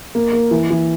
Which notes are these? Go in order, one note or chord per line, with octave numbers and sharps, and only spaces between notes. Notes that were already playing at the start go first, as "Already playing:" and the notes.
A#3
A#3
E3
E3